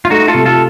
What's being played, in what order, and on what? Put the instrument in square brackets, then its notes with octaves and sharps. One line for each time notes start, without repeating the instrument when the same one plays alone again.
[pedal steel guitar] F4
[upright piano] A3 [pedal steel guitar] D#4 F#4
[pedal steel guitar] F4 A4
[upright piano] C3
[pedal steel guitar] F4 A4